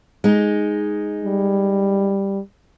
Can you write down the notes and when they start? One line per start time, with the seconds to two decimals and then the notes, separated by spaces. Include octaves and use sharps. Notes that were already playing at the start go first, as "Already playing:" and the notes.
0.24 G#3 D#4
1.24 G3